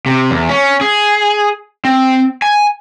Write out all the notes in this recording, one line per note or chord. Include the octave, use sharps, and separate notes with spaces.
C3
E2
C#4
G#4
C4
G#5